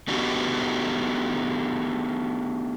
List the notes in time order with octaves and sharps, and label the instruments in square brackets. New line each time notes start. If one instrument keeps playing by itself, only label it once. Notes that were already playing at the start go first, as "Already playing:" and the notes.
[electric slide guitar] A3 B3 D4 D#4 F#4 G4